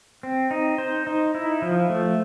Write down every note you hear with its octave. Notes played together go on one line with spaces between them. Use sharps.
C4
D#4
C5
D#4
E4
F3
A3